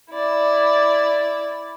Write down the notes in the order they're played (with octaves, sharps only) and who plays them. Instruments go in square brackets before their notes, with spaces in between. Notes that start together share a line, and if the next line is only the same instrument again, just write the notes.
[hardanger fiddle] E4 D5